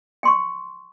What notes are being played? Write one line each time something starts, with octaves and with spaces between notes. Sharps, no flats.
G5 C6 C#6